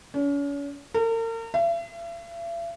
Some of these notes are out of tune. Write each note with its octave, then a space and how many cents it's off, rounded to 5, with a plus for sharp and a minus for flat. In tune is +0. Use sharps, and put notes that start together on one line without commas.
C#4 +40
A#4 -40
E5 +45